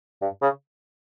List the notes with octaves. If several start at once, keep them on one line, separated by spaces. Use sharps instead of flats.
G2
C#3